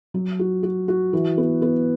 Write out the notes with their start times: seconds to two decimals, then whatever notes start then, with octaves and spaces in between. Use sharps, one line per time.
0.14 F#3
0.39 F#4
0.63 F#4
0.88 F#4
1.13 E3
1.38 B3
1.62 B3